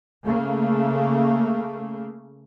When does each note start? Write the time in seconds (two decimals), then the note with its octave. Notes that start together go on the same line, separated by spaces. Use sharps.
0.24 C#3 A3 A#3